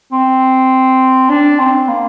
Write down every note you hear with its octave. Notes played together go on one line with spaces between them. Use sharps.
C4
D4
C4
A#3